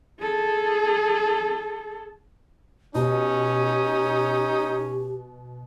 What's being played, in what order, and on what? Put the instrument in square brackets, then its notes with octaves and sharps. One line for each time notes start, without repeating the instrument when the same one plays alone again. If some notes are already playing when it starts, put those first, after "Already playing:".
[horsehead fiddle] G#4 A4
[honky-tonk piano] B2 [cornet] C#4 [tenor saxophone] D#4 [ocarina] G4